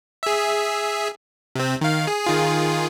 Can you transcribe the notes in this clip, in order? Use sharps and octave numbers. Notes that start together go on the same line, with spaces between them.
G#4 E5
C3 C4
D#3 F5
G#4
D#3 F4 G#4